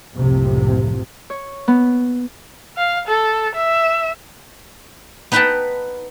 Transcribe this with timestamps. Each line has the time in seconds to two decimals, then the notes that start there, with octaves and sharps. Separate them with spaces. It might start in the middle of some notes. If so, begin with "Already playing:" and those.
0.14 F#1 C2 A2 C3 F3
1.30 C#5
1.68 B3
2.77 F5
3.08 A4
3.55 E5
5.32 B3 D#4 B4 F#5 G5 A5